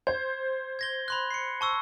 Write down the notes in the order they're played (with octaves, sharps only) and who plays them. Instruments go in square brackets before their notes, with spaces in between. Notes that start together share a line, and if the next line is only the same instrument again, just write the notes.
[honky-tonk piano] C5 [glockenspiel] G#6
[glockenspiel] G#6 A#6 G7
B5 C6 F#6
C7 C#7
A5 C#6 E6